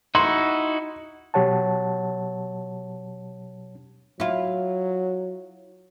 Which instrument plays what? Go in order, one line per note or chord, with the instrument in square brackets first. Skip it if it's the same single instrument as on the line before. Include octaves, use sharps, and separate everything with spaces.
[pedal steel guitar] D#4 E4 F#4 [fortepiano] C6
[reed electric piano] B2 F#3 G4 C#5 F#5 A5
[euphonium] F#3 [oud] E4 F4